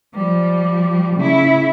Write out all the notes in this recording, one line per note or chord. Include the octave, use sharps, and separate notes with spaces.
F3 G3
C#3 E4